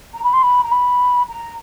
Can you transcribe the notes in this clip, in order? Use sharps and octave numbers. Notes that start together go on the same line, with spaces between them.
A#5
B5
C6
B5
A#5
B5
A#5